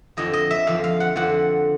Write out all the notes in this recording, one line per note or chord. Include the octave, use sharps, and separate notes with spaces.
F2 D3 F3 D#5
D#5
E5
F2 D3 F3 F5
F5
F#5
F2 D3 F3 F#5